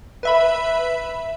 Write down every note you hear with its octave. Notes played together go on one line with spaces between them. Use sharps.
B4 E5 B5